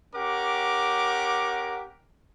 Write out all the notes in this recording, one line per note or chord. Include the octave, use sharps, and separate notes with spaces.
C#4 G4 A#4 F#5 D6